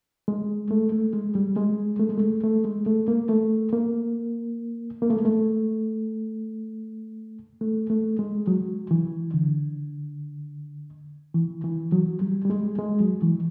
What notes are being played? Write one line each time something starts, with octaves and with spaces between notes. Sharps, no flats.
G#3
A3
A3
G#3
G3
G#3
A3
G#3
A3
A3
G#3
A3
A#3
A3
A#3
A#3
A3
G#3
A3
A3
A3
G#3
F#3
E3
D3
E3
E3
F#3
G3
G3
G#3
G#3
F#3
E3